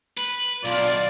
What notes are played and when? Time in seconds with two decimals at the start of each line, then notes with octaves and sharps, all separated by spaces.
0.17 B4
0.64 B1 F4 D5